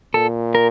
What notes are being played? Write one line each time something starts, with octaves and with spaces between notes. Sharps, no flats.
A#2 A4
A#4